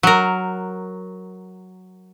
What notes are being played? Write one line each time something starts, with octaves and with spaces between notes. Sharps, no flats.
F#3 A#4